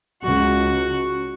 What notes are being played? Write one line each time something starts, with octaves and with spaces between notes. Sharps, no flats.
C#2 F#4